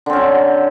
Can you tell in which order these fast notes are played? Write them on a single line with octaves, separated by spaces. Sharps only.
D3 C4 C#4 F#3